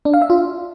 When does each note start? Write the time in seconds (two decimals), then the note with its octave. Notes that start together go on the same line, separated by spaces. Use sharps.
0.05 D4
0.14 F5
0.22 E5
0.30 F4